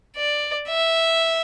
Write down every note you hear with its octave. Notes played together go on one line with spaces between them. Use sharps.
D5
E5